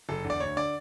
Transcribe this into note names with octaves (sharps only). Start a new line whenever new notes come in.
F#1 A4
E2 D3
D5
D2 C#5
D3 D5